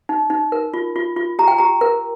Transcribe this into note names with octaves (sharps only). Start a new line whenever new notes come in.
D#4
D#4
A#4
F4
F4
F4
G4 A#5
G5
G4 A#5
A#4